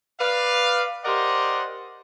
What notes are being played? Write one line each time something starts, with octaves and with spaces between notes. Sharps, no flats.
B4 D5 F5
G4 A#4 C5 D5 D#5 F#5